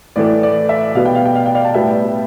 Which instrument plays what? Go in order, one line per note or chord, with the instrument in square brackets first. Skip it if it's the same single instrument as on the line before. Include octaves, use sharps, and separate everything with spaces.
[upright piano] A2 E3 A3 D5
D5
E5
B2 G3 B3 F5
G5
F5
G5
F5
G5
D5 F5
A5
A2 G3 B3 E5 G5